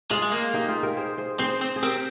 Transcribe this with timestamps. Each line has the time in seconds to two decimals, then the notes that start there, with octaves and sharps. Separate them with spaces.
0.11 G#3 F4 G#4
0.22 G#3
0.32 A#3
0.53 D#4 G4
0.68 F4 G#4
0.83 G4 A#4
0.97 G#4 C5
1.18 G#4 C5
1.39 C4 G#4 C5
1.61 C4
1.76 G#4
1.82 C4 G4 A#4